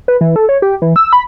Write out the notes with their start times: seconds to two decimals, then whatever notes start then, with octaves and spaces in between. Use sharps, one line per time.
0.08 B4
0.21 E3
0.36 A4
0.49 C#5
0.62 G4
0.82 E3
0.96 E6
1.13 B5